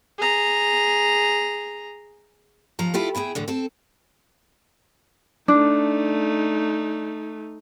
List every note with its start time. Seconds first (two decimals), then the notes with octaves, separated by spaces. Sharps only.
0.18 G#4 A#5
2.79 D#2 F3 A#5
2.94 E4 F4 G4 A4
3.15 E2 E4 G#4 G5
3.35 A2 D3 E3
3.48 C4 A4
5.48 A3 D4 D#4